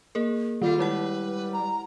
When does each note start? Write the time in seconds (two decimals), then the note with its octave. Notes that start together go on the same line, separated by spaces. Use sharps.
0.15 A#3 G#4 A#4
0.62 D#3 G3 F4 A4
0.79 G#3 E4 B4 F#5
1.53 A#5